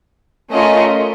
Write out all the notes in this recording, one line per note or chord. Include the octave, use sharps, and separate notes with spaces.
A3 C#4 F4 A#4 D#5